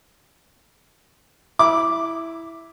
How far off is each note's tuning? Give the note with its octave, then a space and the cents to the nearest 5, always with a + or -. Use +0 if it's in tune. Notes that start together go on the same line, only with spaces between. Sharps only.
E4 +0 B5 -25 D6 +0